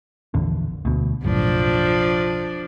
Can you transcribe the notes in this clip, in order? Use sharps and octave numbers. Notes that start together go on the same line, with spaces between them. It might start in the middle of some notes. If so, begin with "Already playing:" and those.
A#1 E2 D3
D2 B2
F#1 B1 A2 F3 D4